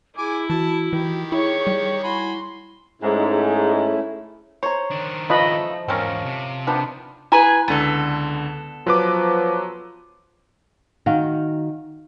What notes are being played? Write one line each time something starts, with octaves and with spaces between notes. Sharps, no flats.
E4 G#4 G#5 D6
E3 F#4 A5
D#3 E3 F#4 G4
E4 G#4 C#5 C#6
G3
E4 F#4 G#5 B5 C6
G#2 A3 C#4 E4 G#4
C5 C#5 A#5
D#3 D4
C#3 F3 A3 B4 D#5 B5
E2 G#2 C4 C#4 A#4
C3
D#3 F3 B3 D4
E4 G#4 B4 G#5 A#5
C#2 D3 B3 A4
F3 F#3 B4 D6
D#3 F#4 F5 G5